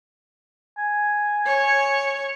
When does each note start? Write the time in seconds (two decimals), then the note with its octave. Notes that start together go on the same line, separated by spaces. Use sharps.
0.78 G#5
1.46 C#5